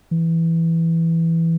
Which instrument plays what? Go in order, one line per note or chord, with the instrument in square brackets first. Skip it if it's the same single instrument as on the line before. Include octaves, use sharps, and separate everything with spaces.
[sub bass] E3